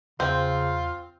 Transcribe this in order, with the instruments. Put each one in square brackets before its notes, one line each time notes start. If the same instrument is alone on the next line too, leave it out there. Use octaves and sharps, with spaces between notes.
[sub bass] E2 [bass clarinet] C#3 [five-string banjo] C4 [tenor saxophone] F4